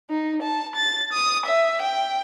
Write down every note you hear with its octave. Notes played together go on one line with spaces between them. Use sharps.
D#4
A5
A6
D#6
E5
G5